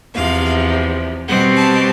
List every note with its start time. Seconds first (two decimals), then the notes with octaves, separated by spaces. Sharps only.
0.15 E2 C3 F3 F5
1.28 B2 G3 C4 F#5
1.56 A5